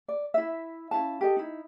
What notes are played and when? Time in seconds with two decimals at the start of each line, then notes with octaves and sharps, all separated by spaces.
0.08 D5
0.34 E4 E5
0.91 C#4 E4 F5 A5
1.21 G4 A4 D#5
1.37 D#4 E4